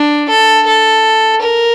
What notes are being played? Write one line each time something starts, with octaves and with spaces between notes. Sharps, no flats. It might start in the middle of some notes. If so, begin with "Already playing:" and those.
Already playing: D4
A4
A4
A#4